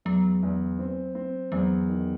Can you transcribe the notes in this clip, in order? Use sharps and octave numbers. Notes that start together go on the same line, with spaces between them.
E2 F#3
E2
C4
C4
E2 F#3
D#3